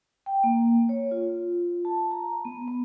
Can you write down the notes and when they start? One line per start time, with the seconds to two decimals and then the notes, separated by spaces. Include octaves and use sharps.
0.26 G5
0.44 A#3
0.89 C#5
1.11 F4
1.85 A5
2.11 A#5
2.45 B3
2.68 B3